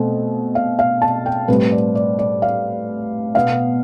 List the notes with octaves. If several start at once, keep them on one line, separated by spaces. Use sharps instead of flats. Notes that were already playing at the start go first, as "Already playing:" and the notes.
Already playing: B2 A3 C4
F5
F5
A5
G5
A2 G3 C4 B4
D5
D5
D5
F5
B2 B3 F5